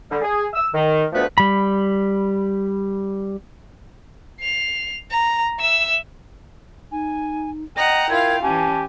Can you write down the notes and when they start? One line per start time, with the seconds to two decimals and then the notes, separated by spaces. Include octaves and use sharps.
0.09 D3 G3
0.21 G#4
0.53 E6
0.73 D#3
1.12 D2 A#2 F3 A3 B3 B4
1.38 G3 B5
4.41 C7 F7
5.11 A#5
5.60 E5 E6
6.92 D#4 G#5
7.77 D#5 F#5 G5 A#5 A#6
8.10 E4 F4 A#4 F5 G#6
8.43 E3 C#4 G4 G#5 A5